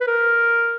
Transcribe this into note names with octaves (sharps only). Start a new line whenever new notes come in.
B4
A#4